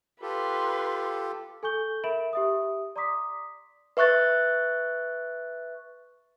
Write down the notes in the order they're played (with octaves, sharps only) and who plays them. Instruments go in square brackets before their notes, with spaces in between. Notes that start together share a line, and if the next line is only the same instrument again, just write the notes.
[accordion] F4 G4 A4 [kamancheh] B4 C6
[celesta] A4 G#5 C#6 G6 G7
A#4 E5 B5 D7 E7 F#7
G4 E5 D#6
D5 A#5 C6 D6 D#6 B6
[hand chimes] B4 E5 C#6 F#6 A6